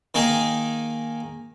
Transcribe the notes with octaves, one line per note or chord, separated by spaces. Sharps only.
D#3 A#3 D#4 G#4